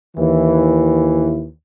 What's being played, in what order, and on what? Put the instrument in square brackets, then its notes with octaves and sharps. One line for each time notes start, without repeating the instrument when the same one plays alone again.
[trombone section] D#2 E3